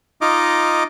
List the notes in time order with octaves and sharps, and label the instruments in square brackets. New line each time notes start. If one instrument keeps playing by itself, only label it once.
[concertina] D#4 F4 D#5 D6